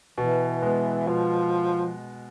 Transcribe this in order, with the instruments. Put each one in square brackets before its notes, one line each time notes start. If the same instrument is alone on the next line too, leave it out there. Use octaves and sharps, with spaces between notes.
[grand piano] B2 [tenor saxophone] E3
[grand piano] G#3 B3
[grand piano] B2 [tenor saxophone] F3